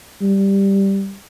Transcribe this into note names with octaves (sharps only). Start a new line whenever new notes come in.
G3